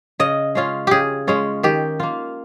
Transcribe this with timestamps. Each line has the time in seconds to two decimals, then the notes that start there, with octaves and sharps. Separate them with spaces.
0.20 C#3 D#5
0.55 G#3 C#4 F4
0.87 C#3 G4 G#4
1.27 G#3 C#4 F4
1.63 D#3 G4
2.00 A#3 F4